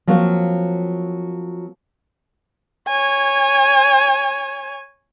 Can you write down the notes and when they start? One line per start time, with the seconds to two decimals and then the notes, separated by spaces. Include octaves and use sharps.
0.07 F3 F#3 A#3 C4 F#4
2.88 C#5 G#5